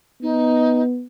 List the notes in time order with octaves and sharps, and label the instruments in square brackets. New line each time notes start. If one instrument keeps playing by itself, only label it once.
[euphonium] B3 [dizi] D#4